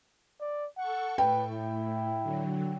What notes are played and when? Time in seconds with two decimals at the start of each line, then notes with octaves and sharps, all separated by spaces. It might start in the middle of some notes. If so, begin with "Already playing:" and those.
0.41 D5
0.78 A4 F#5 C#6
1.18 A2 B4 G5
1.51 E4
2.23 D3 F#3